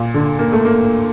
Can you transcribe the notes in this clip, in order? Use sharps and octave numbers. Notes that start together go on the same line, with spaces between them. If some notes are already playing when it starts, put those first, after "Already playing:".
Already playing: A#2
D3
A#3
A3
A#3